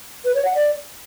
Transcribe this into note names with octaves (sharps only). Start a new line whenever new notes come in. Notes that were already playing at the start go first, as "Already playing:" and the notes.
B4
C#5
F#5
D5